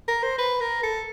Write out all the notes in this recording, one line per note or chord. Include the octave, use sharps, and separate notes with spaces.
A#4
C5
B4
A#4
A4